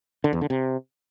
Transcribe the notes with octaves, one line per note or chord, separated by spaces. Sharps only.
D3
E2
D3
C3